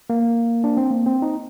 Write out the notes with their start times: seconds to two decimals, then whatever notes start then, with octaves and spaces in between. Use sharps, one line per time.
0.10 A#3
0.64 D4
0.77 C4
0.90 A#3
1.06 C4
1.22 D#4